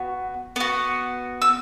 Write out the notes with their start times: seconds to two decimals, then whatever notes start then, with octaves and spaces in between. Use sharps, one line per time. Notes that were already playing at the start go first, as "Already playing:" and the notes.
Already playing: B3 F#4
0.56 B3 F#4
1.42 E6